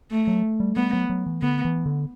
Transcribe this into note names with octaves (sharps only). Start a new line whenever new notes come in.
A3
F#3
G3
G3 B3
F#3
F#3
E3
D3 B3
E3
D3